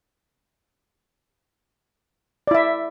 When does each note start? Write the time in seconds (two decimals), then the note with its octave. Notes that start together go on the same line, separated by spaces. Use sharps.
2.47 D5
2.51 E4
2.55 E5